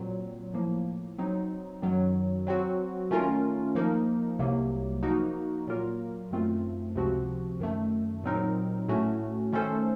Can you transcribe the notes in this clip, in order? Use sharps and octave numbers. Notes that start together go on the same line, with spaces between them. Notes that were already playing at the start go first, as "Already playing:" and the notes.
Already playing: A#2 F#3 C4
A2 F3 A#3
F#3 C4 D#4
F#2 D#3 F#3
F#3 C4 F#4
D#3 A3 C#4 F4 A#4
F3 A#3 D#4 A#4
C2 C3 F#3 A#3
F3 A#3 D#4 F#4 A#4
A#2 F#3 A#3 F4 A#4
F#2 D#3 A3 C4 F4
C#2 C3 F3 C4 F#4
F#2 D#3 A3
A#2 F#3 C4 D#4 A#4
A2 A3 C#4 F#4
D#3 A3 C#4 A4 C5